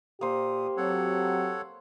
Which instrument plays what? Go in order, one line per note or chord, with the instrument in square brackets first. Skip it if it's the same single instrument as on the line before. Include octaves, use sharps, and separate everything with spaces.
[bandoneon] A#2 D#6 [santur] A#3 C5 [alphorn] G4
[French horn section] F#3 C4 [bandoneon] A4 C#5 F#5